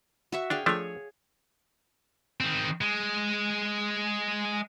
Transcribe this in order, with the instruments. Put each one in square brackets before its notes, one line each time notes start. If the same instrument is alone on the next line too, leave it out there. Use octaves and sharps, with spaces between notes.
[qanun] F#4 E5 C#6
[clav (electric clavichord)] D4 [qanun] G#4 F5 G5
[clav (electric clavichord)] F3 A3 D4 [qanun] G#4 C#5
[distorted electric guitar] D#3 C4
G#3